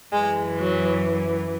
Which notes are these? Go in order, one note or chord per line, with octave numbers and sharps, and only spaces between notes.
F#2 E3 G#3
F#3